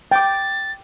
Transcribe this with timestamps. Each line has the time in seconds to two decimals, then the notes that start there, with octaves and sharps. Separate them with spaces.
0.11 G5 D6 A6